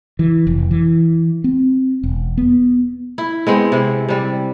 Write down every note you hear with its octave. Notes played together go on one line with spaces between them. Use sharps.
E3
F1
E3
C4
E1
B3
E4
G#3 B3 C4
C3 E4
C3 G3